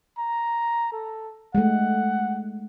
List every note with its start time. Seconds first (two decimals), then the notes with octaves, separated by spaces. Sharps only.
0.18 A#5
0.92 A4
1.55 G#3 A3 F#5